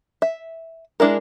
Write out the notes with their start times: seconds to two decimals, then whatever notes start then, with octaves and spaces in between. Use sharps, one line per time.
0.22 E5
1.00 G#3 D4 E4 A#4